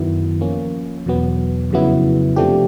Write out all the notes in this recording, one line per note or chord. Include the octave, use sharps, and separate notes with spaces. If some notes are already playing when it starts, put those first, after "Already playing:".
Already playing: F#2 D#3 F#3 B3 E4
F3 A#3 C#4
E2 B2 F#3 B3
F2 C#3 F#3 B3 E4
C3 F3 A3 D4 G4